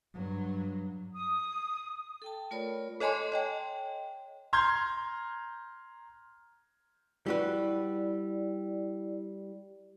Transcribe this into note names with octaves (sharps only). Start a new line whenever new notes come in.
G2 F#3
D#6
A4 G5 A5
A3 F4 A#4 C#5 D5 B5
A4 C#5 D#5 G#5 A5 C6
C#5 D#5 G5
A#5 C6 F6 G6 G#6
G3 E4 F#4 B4 D5